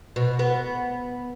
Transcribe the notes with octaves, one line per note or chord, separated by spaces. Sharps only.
B2
B3